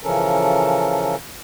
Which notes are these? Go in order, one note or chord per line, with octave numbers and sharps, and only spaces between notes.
C#3 E3 F3 C#4 A4 A#4